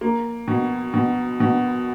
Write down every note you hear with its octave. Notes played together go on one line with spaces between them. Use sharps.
A#3
B2
B2
B2